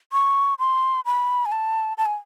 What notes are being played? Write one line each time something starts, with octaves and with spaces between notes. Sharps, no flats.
C#6
C6
B5
G#5
A5
A5
G#5